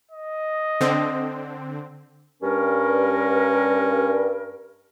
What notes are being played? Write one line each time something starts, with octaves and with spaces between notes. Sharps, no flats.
D#5
D3 C4
G2 C#4 A#4